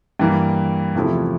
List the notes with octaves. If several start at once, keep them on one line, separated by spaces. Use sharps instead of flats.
G2 E3 A#3
E2 C3 F3 A3 E4